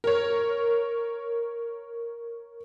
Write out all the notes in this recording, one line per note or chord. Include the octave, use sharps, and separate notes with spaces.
A#4 C#5